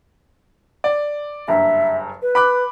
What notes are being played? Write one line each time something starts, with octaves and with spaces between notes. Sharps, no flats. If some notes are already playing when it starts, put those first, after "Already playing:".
D5
F#1 G2 E5 A#5
B4
B5 D6 F#6